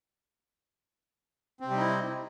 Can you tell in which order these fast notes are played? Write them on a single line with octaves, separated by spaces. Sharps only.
C4 C3 G3 D#4 E4